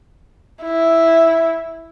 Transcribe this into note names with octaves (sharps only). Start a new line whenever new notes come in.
E4